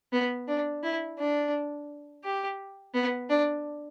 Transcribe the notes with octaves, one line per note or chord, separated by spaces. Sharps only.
B3
D4
E4
D4
G4
B3
D4